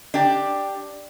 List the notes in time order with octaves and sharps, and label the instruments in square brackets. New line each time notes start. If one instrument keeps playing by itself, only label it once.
[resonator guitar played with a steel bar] D4 G4